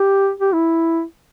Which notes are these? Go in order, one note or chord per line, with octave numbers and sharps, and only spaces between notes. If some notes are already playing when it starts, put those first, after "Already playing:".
Already playing: G4
G4
E4